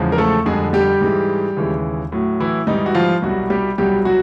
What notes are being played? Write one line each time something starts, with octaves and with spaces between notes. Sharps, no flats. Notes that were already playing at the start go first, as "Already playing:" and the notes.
Already playing: E2 C#3 F3 G#3
A#4
A3 A4
F2 D3 G3 G#3 G#4
G3 G4
G#2 E3 G#3
D#2 C#3 E3 G#3
A2 F#3
E3 E4
G#2 D#3 E3 G3 D#4
F#4
F3 F4
C2 B2 F#3 G3 F#4
G3 G4
C2 B2 F#3 G3 G4
F#3 F#4